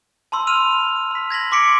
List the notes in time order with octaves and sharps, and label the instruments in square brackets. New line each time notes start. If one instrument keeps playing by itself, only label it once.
[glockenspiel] A5 B5 C6 E6
B5 F6 D#7 F7
B5 B6
G#6 A#6 B6 F#7
C6 D6 B6 C#7 D7